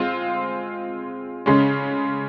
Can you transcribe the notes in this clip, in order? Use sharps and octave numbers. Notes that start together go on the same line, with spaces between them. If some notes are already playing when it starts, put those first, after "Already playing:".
Already playing: G#3 C4 F4
C#3 G#3 C#4